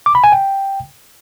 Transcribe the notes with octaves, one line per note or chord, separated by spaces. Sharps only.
D6
B5
G#5
G5